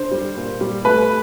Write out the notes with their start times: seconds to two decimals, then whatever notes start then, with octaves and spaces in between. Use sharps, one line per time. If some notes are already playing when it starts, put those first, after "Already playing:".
Already playing: D3 C5
0.11 G3
0.37 A#2
0.61 G3
0.85 A3 B4